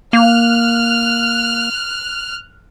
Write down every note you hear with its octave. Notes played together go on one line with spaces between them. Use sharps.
A#3 F6 F#6